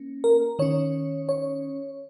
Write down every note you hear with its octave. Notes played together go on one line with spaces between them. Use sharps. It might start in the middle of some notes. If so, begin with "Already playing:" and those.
Already playing: A#3 C#4
A#4
D#3 C#4 C#5
C#5